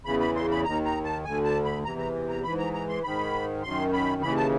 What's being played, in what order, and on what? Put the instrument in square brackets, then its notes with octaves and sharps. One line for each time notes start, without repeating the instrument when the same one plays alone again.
[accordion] E2 C#3 E3 B5
B5
C6
B5
D#2 D#3 A#5
A#5
A5
D2 D3 G#5
A5
B5
E2 C3 E3 A#5
A#5
A#5
G#2 E3 B5
A#5
A#5
C6
G#2 D#3 B5
F#2 D#3 C6
B5
D#2 C#3 E3 B5
A5